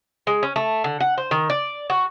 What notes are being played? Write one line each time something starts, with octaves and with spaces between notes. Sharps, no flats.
G#3
C#4
A3
D3
F#5
C5
D#3
D5
F#4